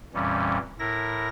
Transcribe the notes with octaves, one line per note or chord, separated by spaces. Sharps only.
F2 A#2 E3 G3 C#4
A2 E4 A#4 A#6